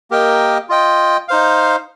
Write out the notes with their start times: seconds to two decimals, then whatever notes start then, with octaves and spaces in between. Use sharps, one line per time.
0.11 A#3 G4 A#4 D#5 G5
0.69 F4 D#5 G5
1.28 D#4 C5 F5